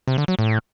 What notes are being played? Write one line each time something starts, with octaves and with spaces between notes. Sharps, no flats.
C3
D3
F#3
A2